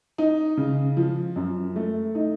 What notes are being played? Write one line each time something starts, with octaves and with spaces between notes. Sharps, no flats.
D#4
C#3
F3
F#2
A3
D#4